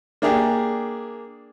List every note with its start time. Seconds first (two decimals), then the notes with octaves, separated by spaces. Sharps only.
0.22 A#3 D4 G4 G#4